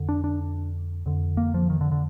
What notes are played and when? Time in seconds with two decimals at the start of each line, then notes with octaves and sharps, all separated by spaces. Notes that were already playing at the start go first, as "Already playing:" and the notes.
Already playing: F2 D3
0.09 D4
0.24 D4
1.06 F2 D3
1.37 A#3
1.54 F3
1.70 D#3
1.81 D3
1.92 D3